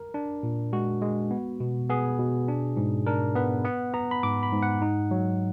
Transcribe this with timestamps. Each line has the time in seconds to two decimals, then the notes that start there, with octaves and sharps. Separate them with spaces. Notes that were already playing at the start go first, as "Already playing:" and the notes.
Already playing: A#4
0.14 D4
0.43 A#2
0.73 G#3 F#4
1.02 G#3
1.31 B3
1.60 B2
1.90 B3 G#4
2.19 B2
2.48 D4
2.77 G#2
3.07 D4 A#4
3.35 B3 B4
3.65 B3 F#5
3.94 B3 A#5
4.11 B5
4.23 G#2 D6
4.43 B5
4.52 G#2
4.63 F#5
4.82 D#4
5.11 F#3